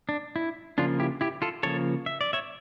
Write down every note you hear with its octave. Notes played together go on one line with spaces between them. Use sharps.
D4
E4
C#3 F3 A#3 D4 F4
E4 G4
E4 G4
F4 A4
C#3 F3 A#3 A4 C#5
E5
D5
C#5 E5